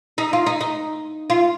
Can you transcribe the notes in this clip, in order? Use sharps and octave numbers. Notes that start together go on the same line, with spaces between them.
D#4
F4
D#4
D#4
F4